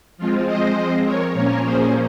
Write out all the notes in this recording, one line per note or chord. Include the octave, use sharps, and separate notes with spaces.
F3 G#3 C4 F4
C5 D#5
A#4 C#5
A#2 F3 A#3 C#4 A#4 C#5
G#4 C5